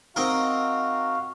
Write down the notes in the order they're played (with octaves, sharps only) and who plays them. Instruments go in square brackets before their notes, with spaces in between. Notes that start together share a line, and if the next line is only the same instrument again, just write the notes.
[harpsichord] C4 D#4 A#4 [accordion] F#4 F5